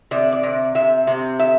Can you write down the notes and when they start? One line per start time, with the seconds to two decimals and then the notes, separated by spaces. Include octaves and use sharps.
0.11 C3 D5
0.32 D5
0.43 C3
0.75 C3 E5
1.07 C3
1.39 E5